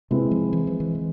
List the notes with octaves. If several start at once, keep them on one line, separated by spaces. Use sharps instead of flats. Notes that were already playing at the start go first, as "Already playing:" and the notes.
C3 G#3 C4 E4 B4
F3
E3
F3
E3
E3